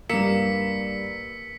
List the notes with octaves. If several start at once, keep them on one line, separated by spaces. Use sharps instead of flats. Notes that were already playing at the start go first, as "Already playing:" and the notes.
G2 A#3 E6 B6 C#7 E7